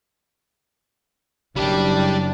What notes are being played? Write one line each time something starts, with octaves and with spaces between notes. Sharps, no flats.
F#1 G3 D4 G4